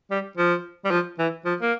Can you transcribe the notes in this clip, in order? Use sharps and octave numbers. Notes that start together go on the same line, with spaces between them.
G3
F3
G3
F3
E3
F3
A#3